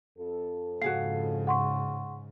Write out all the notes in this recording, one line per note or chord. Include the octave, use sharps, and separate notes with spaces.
F2 A4
G#2 C#3 F#4 G#4 F5 C7
F#5 C6 C#6